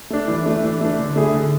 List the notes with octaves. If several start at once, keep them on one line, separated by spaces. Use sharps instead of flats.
A3 D4
E3
A3 D4
E3
A3 D4
D3
A3 E4 G#4
D3